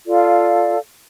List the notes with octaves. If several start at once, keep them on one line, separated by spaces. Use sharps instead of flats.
F4 A4 D5 F5